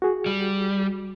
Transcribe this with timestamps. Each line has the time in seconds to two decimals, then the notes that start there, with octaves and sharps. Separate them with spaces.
0.02 F#4 G#4
0.26 G3